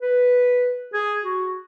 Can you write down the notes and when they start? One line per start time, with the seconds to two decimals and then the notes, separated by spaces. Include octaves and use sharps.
0.01 B4
0.93 G#4
1.24 F#4